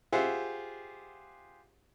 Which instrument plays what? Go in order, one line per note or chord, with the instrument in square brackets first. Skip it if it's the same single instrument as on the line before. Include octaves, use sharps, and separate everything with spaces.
[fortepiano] F4 G4 G#4 C5 E5 F#5